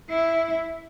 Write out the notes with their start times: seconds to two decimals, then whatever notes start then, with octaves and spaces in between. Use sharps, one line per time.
0.09 E4